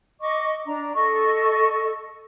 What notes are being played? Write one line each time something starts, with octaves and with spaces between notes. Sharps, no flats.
D#5 C#6 D6
D4 A#5
A4 D#5 C#6